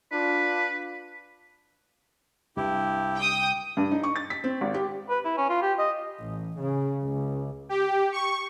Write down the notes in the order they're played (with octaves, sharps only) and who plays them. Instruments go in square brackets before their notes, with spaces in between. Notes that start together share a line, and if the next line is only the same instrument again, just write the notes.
[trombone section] D4 F4 [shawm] B4
[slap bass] C2 [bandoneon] G2 E4 G4
[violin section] G5 D#6
[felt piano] G2
D#4
C#6
A6
B6
C4
G#1
G4
[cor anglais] B4
E4
C#4
F4
G4
D#5
[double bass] A1
C#3
C#2
[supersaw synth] G4
C#6